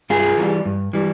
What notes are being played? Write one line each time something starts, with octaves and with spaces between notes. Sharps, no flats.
G2 F4 G#4
E3 G3
G2
E3 G3